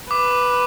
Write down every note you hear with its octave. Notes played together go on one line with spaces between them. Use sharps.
B4 D6